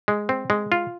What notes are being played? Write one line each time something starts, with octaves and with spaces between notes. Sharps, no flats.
G#3
C4
G#3
F4